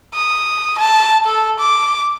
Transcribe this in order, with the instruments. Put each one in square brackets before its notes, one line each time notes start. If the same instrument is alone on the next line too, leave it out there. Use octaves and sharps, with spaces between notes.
[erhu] D#6
A5
A4
D6